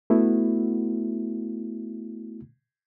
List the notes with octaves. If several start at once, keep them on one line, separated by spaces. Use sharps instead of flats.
A3 B3 E4 F#4